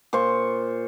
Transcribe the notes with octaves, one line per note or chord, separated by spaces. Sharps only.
A#2 F4 C5 C#6